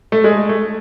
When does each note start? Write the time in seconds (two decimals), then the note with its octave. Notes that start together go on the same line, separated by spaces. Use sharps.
0.12 A3
0.24 G#3
0.49 A3